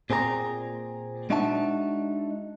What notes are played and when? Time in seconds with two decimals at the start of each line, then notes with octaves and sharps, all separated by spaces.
0.10 A#2 C4 G#4 C5 A#5
1.30 G#3 D4 D#4 F#4 E5 A5